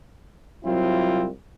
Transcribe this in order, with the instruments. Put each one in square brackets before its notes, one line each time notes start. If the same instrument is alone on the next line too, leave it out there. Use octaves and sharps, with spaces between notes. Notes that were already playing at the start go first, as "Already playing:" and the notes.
[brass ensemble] C2 F#3 C4 E4 F4